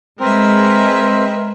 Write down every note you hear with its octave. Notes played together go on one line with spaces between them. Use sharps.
G#3 C4 A#4 B4 E5